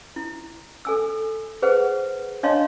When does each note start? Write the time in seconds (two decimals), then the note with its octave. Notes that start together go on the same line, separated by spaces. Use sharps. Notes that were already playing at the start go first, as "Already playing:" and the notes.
0.16 E4
0.85 A4 G#5 E6
1.62 G#4 B4 C5 F#5
2.43 D4 C#5 D#5 F5 A5 C6